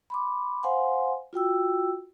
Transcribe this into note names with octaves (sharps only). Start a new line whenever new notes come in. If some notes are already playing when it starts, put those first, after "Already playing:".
B5 C6 D6
C5 F5 F#5 G#5 C6
F4 F#4 G5 E6